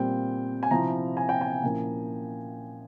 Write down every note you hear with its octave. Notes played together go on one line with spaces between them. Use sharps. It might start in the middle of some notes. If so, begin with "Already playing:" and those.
Already playing: A#2 G3 C4 G5
G#5
C3 F3 C4 E4 A#5
G#5
G5
G#5
A#2 F3 A#3 C#4 E4